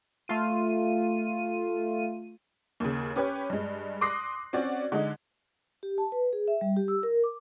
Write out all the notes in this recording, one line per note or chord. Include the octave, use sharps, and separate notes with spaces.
A3 F4 D#7
D#2 C#3
C#4 G4 B4 C#5
G2 G#3
C6 D6 D#6 F#6 A#6 C7
C4 C#4 F#4 D5
D3 G#3 D#4
G4
A5
B4
G#4
E5
G3
G4
E6
A#4
D6